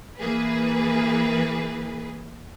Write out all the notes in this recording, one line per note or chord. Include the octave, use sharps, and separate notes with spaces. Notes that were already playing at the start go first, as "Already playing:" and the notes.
E3 A#3 G#4 B4